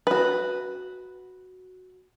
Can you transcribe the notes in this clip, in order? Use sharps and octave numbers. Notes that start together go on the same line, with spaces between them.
F#4 B4